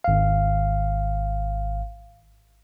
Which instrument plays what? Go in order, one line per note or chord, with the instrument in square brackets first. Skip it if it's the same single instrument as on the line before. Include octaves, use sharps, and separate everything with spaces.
[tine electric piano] G#1 F5